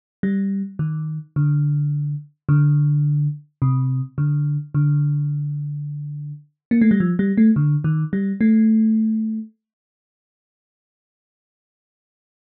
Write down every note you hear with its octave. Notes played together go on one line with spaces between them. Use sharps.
G3
D#3
D3
D3
C3
D3
D3
A#3
A3
G3
F3
G3
A3
D3
D#3
G3
A3